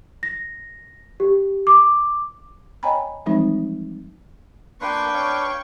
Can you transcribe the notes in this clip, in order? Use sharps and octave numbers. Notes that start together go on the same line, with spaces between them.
A#6
G4
D6
C#5 D#5 G5 G#5 A#5 B5
E3 F3 G3 G#3 C4 D#4
A#3 D4 B4 G5 C6 C#6
C#5 F5